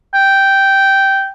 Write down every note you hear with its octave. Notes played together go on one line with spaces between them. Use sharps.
G5